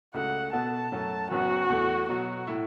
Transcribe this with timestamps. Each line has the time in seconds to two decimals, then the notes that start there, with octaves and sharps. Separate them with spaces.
0.14 C#2 C#3 A3 F#4 F#5
0.53 B2 B3 F#4 A4 A5
0.92 F#2 F#3 A3 F#4 A4
1.31 F#1 F#2 F#3 B3 F#4
1.70 E2 E3 A3
2.09 B2 F#3 B3 F#4
2.47 A2 A3 E4